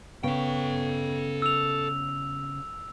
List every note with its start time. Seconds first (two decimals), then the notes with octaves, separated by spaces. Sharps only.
0.23 C#3 B3 A4 G5
1.42 E6 F7